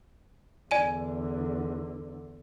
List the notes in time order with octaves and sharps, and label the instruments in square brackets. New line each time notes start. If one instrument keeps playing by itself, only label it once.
[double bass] E2 D3 [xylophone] D5 G#5 D#7